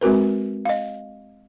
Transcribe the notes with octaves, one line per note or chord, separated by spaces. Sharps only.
G#3 C4 F#4 A#4 B4
D#5 F5